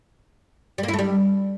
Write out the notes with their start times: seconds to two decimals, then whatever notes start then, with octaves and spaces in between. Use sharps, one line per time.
0.78 G3
0.83 A#3
0.88 E4
0.93 A3
0.99 G3